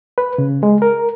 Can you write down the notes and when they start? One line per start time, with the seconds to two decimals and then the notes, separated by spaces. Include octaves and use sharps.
0.18 B4
0.38 C#3
0.63 G#3
0.82 A#4